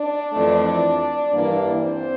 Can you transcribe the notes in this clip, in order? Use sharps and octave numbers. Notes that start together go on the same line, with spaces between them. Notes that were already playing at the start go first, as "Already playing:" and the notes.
Already playing: D4 D5
F2 E3 A3
G2 E3 A#3 D4
C4 C5